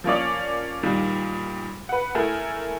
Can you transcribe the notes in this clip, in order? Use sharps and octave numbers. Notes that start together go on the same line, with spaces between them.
F3 A#3 C#4 D5
A#2 D#3 G3
B4 F#5
A3 E4 G#4 A#4